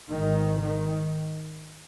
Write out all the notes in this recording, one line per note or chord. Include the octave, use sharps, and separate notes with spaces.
G#1 G#2 D#3
D#3